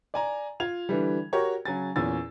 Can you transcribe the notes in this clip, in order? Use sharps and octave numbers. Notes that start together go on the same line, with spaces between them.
D5 G#5 A#5
F4 G#6 F7
D3 E3 G3
F#4 G4 A#4 C#5
C#3 F#3 G#5 A6
E2 A#2 C#4 G#5 E6 A6